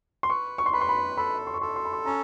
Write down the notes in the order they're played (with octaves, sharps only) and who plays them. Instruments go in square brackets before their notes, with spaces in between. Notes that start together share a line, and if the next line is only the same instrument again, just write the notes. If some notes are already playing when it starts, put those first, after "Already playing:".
[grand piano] C6
[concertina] B4 [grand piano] C#6
[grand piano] C#6
C6
[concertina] B4 [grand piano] B5
[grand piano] C6
B5
[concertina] A4 [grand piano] B5
[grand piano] C6
C#6
[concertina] A4 [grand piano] C6
[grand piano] C6
B5
C6
[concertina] C#4 [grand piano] A#5